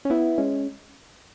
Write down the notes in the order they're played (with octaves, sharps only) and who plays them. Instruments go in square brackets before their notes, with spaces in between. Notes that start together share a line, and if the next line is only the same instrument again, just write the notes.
[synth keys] C#4
B3 E4
G#3 C#4